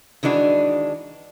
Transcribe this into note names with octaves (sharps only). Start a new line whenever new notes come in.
D#3 E3 G#3 D4 F#4